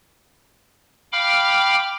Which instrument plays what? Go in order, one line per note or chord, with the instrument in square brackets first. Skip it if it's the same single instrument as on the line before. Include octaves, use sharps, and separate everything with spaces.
[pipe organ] F5 G5 B5 D6 F6